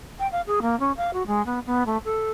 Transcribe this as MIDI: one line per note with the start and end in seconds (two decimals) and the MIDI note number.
0.19 0.27 79
0.32 0.41 77
0.47 0.60 68
0.62 0.78 58
0.80 0.92 61
0.97 1.11 77
1.13 1.26 66
1.27 1.44 56
1.46 1.59 59
1.66 1.84 59
1.86 1.97 57
2.05 2.31 69